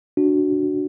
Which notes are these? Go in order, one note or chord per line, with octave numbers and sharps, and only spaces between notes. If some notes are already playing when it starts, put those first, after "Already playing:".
D4 F#4